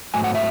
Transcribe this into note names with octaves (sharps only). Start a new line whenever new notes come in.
G#2 F#3 A3 G#5
F#5
E5